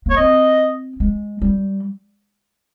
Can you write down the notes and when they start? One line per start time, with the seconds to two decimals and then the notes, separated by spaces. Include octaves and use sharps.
0.06 A#3 C#5
0.16 C4 D#5
1.00 G#3
1.42 G3